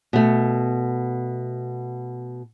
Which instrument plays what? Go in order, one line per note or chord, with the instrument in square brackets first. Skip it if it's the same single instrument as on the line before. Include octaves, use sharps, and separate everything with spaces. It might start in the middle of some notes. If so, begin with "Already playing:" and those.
[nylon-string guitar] B2 A3